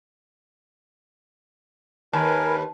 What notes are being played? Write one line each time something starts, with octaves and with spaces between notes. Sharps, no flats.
D#2 A#4 B4 G#5 A5